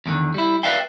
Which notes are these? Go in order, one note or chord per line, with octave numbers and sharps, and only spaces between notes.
E2 A2 D3 D#3
G3 E4
B4 D5 E5 F5 G5